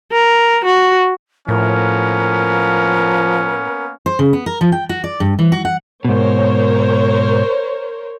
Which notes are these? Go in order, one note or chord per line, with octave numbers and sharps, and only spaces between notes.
A#4
F#4
A2 F3 A#3 B3 C#4 A#4
C5
C#3
B3
A#4
F3
G5
F#4
D5
G2
E3
F#4
F#5
G#2 B2 A#4 C5 C#5